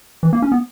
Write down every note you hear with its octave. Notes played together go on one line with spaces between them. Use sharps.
E3
A#3
C#4
B3